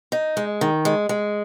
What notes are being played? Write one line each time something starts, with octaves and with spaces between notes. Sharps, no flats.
D#4
G#3
D#3
G#3
G#3